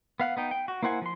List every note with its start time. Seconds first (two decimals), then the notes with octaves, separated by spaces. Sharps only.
0.20 B3 F5 F#5
0.37 B3 D#4 G5
0.51 G5
0.68 F#4
0.83 A#3 E4 C5 F#5 G#5
1.02 F3 C6